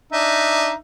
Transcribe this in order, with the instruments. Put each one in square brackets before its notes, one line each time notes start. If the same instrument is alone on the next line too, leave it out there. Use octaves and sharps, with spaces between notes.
[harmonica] D4 D#4 E5